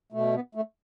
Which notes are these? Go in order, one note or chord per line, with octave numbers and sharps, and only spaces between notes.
B2 A3
B3
A3